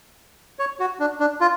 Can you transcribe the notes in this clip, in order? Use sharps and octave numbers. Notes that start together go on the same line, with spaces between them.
C#5
F#4
D4
D4
F4